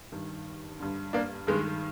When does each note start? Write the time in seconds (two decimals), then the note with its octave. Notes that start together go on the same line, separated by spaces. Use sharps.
0.12 G2 D#3
0.79 G2 D3
1.13 A#3 D4
1.47 G2 D#3 G#3